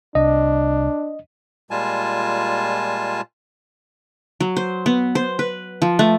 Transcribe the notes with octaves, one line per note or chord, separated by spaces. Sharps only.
C2 D4 D#5
A#2 G3 G#3 F4 G#5 A5
F#3
C5
B3
C5
B4
F3
A3